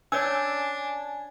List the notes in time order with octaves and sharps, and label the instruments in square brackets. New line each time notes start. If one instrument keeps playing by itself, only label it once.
[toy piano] C#4 C#5 D5 [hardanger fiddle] D4 [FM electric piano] G#5 [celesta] E6